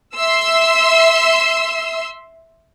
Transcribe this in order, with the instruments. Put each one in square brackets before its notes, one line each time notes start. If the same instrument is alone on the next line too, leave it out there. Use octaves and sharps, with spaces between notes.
[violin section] E5 C6 E6